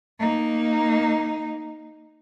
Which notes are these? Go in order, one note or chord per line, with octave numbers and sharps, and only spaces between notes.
A#3 D#4